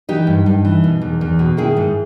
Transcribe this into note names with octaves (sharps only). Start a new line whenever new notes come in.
E3 D#4 G4
G2
G2
E3
B2
E2
E2
B2
D#3 E4 G#4
G#2